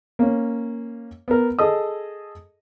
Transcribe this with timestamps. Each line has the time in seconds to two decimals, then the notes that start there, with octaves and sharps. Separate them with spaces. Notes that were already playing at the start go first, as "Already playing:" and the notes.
0.19 A#3 C#4
1.28 B3 A#4
1.59 G#4 A4 D#5 D#6